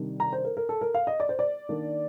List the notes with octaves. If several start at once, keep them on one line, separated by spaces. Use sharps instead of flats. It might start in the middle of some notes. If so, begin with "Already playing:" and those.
Already playing: C3 D#3 G3 D4
A#5
C5
A#4
A#4
A4
A#4
F5
D#5
D5
C5
D5
D#3 A#3 D4